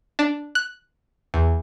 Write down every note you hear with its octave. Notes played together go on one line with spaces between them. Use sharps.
D4
F#6
E2